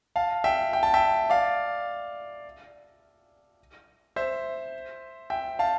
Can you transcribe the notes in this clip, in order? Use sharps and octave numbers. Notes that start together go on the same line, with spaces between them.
F5 A5
E5 G5
G5
A5
E5 G5
D5 F5
C5 E5
E5 G5
F5 A5